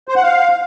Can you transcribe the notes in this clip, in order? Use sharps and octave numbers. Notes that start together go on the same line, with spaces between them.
C5
F#5
F5